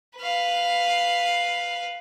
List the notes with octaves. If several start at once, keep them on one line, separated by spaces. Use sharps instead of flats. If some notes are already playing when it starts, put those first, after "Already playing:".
B4 F5